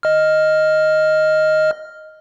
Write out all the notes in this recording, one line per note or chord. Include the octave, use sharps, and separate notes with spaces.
D#5 F6